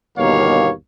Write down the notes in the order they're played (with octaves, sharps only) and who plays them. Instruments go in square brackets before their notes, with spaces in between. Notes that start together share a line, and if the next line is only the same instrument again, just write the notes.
[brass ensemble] G1 D#2 B2 A#3 C#5 F5